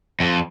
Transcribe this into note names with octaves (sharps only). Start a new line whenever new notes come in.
F2